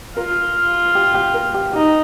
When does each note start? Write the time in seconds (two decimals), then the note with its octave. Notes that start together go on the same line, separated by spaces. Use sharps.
0.17 F4 A#4
0.95 G4
1.14 G4
1.34 A#4
1.54 G4
1.73 D#4 G4